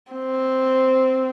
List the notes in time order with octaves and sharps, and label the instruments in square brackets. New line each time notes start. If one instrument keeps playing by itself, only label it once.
[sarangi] C4